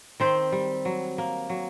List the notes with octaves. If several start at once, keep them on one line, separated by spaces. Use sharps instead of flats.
D#3 C4 C5
G3
F#3
A#3
F#3